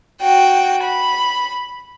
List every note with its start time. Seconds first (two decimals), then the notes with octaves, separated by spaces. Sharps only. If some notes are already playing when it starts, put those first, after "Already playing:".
0.22 F#4 G5
0.84 B5